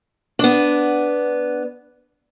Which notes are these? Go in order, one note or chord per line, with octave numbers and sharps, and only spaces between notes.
B3 D4